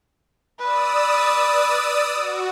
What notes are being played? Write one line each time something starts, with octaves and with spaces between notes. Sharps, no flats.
B4 D5 D#6 E6
F#4